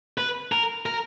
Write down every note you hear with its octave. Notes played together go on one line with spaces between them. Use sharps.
B4
A#4
A#4